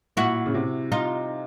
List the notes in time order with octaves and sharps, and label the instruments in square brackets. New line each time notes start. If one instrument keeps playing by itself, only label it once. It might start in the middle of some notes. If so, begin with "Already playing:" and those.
[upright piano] A#2 [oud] E4 F#4
[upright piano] C#3
C3
[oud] D#4 F4